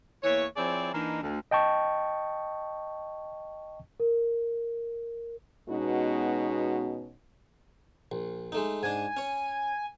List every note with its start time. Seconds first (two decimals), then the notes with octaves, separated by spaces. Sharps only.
0.24 E2 E3 A#3 C#5
0.57 F3 C4 E4 G#4 C#5 D5
0.93 E3 A#3 D4 D#4
1.22 D2
1.51 D#5 G5 A5 C#6
4.00 A#4
5.69 B2 G#3 B3 C#4 D#4 F#4
8.12 A#1
8.52 G#3 A3 D#4
8.83 G#2 D4 G#5
9.17 C#4 C#5